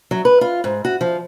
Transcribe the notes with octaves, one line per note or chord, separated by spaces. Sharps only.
F#3
B4
F4
G#2
F#4
F3